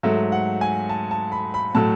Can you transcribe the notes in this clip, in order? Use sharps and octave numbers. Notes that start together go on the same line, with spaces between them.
G#2 F#3 A3 E5
F#5
G#5
A5
A5
B5
B5
A2 F#3 A3 A5